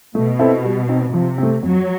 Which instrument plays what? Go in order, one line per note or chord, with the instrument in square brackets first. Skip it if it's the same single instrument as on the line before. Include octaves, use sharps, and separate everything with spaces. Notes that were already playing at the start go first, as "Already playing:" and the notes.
[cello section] B2 [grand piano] A3
[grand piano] C4 E4 A4 C5
G3
C4 D#4
[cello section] C3 [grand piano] F3
[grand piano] A3 C4
[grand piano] F2 [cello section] F#3